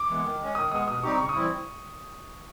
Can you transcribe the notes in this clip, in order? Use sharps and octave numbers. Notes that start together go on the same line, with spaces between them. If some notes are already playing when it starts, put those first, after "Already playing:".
Already playing: D6
E3 G#3 B3
D#3
G#3 C#4
D#3 D#6
G#3 B3 D#6
B2 D#6
G3 C4 D#4 G4 C#6
C#3 C#6
D#6
E3 G3 C4 E4